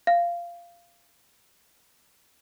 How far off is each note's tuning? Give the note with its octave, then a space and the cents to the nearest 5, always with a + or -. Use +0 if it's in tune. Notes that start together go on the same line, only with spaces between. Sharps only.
F5 -15